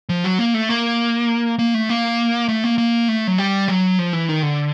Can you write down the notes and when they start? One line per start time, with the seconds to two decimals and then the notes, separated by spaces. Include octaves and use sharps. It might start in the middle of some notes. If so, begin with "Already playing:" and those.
0.09 F3
0.24 F#3
0.39 A#3
0.54 A3
0.69 A#3
1.59 A#3
1.74 A3
1.89 A#3
2.49 A3
2.64 A#3
2.78 A#3
3.08 A3
3.27 F#3
3.38 G3
3.68 F#3
3.99 F3
4.13 E3
4.29 D#3
4.43 D3